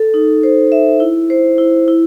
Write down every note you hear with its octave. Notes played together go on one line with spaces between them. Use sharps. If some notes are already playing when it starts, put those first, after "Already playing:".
Already playing: A4
D#4
C5
E5
E4
C5
E4
E4